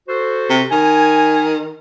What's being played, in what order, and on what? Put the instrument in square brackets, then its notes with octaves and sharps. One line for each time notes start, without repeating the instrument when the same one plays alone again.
[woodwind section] F#4 A4 C5
[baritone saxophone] C3
[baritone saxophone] D#3 [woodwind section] G#5